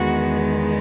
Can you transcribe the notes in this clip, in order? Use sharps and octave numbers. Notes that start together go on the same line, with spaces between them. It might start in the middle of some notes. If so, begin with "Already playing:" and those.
Already playing: E2 D#3 G#3 B3 F#4